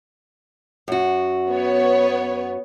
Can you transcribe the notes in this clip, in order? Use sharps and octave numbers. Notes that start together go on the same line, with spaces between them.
F#2 F#4
B3 C#5